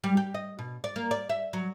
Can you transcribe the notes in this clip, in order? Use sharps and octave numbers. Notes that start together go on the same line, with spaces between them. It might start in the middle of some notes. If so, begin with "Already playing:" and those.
G3
G4
D#5
B2
D5
A#3
D5
E5
F#3